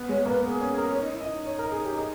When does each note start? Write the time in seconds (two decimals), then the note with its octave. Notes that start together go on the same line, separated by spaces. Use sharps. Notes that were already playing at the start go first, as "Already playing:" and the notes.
Already playing: B3
0.09 G#3 C#5
0.26 A#3 B4
0.43 B3 G#4
0.61 C#4
0.78 A#4
0.89 C#4
0.95 C#5
1.00 D#4
1.12 E4
1.21 D#5
1.29 D#4
1.46 C#5
1.59 A#4
1.72 G#4
1.85 G4
1.98 G#4